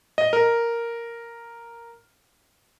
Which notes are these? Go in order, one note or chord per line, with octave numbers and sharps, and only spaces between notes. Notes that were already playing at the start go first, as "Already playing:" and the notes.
D#5
A#4